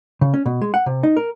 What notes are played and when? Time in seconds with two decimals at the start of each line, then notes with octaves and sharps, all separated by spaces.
0.21 C#3
0.34 C#4
0.46 B2
0.62 G#3
0.74 F#5
0.86 C3
1.03 D#4
1.17 A#4